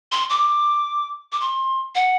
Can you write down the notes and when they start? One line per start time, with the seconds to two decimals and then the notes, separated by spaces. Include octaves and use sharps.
0.12 C6
0.30 D6
1.32 D6
1.41 C6
1.95 F#5